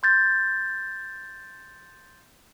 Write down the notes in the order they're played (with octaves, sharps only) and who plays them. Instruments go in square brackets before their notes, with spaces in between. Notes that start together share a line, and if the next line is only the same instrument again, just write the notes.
[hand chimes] C6 G6 A6